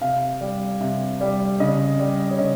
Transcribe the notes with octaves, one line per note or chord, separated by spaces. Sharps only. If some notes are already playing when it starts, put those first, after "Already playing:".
C3 F5
G3
C3
G3
C#3 D#5
G3
C#5
C#3 D#5